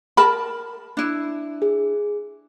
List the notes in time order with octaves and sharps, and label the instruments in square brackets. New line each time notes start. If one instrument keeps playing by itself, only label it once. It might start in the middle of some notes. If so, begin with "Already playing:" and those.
[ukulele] A#4 A5 B5
D4 E4
[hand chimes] G#4